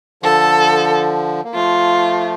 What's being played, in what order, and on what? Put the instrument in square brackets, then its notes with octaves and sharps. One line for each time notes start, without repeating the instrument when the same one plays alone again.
[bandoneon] D3 F3 [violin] A4
[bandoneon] A#3
[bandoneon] F3 A3 [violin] F4